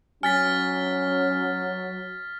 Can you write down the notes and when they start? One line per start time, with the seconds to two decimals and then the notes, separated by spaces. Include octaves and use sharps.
0.23 F#3 C#4 G#5 F6 A6 B6